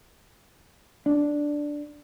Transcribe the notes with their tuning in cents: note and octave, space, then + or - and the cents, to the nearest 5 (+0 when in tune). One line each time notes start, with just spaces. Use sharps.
D4 +0